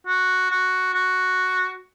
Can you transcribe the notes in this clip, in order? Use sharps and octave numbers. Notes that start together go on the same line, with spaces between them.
F#4
F#4
F#4